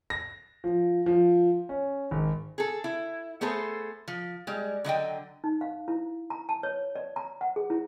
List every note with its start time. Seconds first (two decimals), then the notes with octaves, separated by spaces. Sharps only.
0.10 A#6
0.64 F3
1.06 F3
1.69 C#4
2.11 G#1
2.58 G#4 A4
2.84 E4
3.41 A3 B3 G#4 A4 C5
4.08 F3
4.47 G3 G#3
4.84 D3 F#3 D#5 G5
5.44 D#4
5.61 F5
5.88 E4
6.30 A#5
6.49 A5
6.63 C#5
6.95 D5
7.16 A#5
7.41 F#5
7.56 G#4
7.70 E4